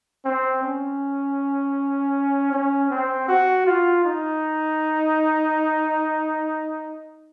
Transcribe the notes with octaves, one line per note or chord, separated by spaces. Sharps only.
C4
C#4
C#4
C4
F#4
F4
D#4